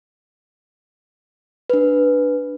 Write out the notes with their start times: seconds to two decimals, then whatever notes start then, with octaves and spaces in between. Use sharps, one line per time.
1.70 D4 B4